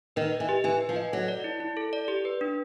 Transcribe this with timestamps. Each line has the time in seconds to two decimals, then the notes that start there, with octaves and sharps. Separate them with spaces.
0.16 D#3 B4
0.32 D#5
0.40 E3
0.49 G4
0.64 E3 G#5
0.81 B4
0.89 F3
0.96 D#5
1.12 F#3 A4
1.28 D5
1.44 E4
1.60 E4
1.77 A4
1.93 D5
2.08 G4
2.25 B4
2.41 D4